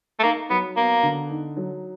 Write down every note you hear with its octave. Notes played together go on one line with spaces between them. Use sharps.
A3
A#3 D#4
F#3 B3
A#3 B3
D3
D#4
F#3